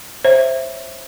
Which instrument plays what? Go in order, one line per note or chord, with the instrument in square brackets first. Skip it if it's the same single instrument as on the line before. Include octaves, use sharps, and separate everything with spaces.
[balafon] C5 C#5 E5